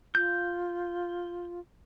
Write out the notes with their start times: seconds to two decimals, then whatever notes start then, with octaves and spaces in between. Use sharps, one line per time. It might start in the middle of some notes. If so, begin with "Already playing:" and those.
0.15 F4 G6